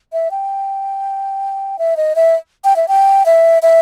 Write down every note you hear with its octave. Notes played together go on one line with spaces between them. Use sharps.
E5
G5
E5
D#5
E5
G5
E5
G5
E5
E5